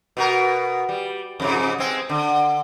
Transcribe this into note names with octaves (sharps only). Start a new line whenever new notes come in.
B2 F#4 A#4
G3
F2 G#2 C#3
G#3 C4
D3